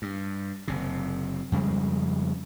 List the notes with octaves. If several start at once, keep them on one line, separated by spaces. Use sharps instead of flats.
G2
F#1 C3
F2 C#3 G3 G#3